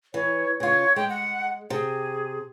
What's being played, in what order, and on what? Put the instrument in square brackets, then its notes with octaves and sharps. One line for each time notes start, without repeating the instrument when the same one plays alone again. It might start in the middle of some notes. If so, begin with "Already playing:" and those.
[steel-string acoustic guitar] E3 [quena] C#5
[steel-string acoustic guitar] C#3 F4 [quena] C#5
[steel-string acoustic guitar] G#3 [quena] G5
[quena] F#5
[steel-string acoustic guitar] C3 [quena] G#4